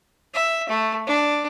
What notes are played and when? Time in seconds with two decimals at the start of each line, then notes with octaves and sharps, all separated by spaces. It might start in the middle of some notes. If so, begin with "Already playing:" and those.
0.34 E5
0.69 A3
1.07 D4